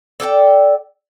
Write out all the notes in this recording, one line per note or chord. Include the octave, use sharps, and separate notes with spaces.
A4 D5 F#5 G5